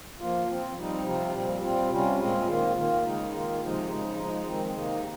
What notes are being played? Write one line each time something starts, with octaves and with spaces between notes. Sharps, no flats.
F3 A#3 F4
F3 C4 F4
G3 C4 D#4
C3 F3 C4 F4
A#2 G3 C4
G3 C4 F4
C3 G3 C#4 F4
A#2 G#3 C4 F4
D#3 A#3 F4
D#3 A#3 F4
C#3 G#3 D#4
D#3 A#3 F4
C3 F3 G#3 D#4
C#3 G#3 D#4
F3 G#3 D#4
D#3 G#3 C4
C3 D#3 A#3 D#4